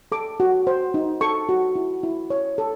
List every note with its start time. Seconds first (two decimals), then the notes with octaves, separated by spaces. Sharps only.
0.12 A4 D6
0.40 F#4
0.67 C5
0.94 D#4
1.21 A4 C#6
1.49 F#4
1.76 E4
2.03 E4
2.30 C#5
2.58 A4